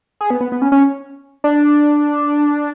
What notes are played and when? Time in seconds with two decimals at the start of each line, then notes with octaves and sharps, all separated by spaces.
0.21 G#4
0.30 B3
0.41 B3
0.52 B3
0.62 C#4
0.72 C#4
1.44 D4